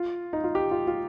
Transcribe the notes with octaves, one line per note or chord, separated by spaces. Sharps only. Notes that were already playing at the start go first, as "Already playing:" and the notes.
Already playing: F4
D#4
F4
G4
F4
F4